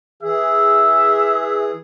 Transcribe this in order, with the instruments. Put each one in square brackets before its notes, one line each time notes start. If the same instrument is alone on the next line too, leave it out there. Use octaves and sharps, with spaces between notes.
[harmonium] E3 G#4 [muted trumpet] E5